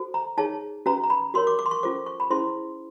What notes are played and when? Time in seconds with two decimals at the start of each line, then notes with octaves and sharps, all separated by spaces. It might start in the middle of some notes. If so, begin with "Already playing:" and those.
Already playing: F#4 A4 C5
0.14 A#5
0.38 D#4 G#4 C#5 A5
0.86 C#4 F#4 B4 A#5
1.03 A#5
1.10 B5
1.34 F#4 A#4 C#5 C6
1.47 D6
1.59 D6
1.66 C6
1.71 C#6
1.83 C#4 F4 A4 C5 D6
2.06 C#6
2.20 B5
2.30 C#4 E4 G#4 C5 C6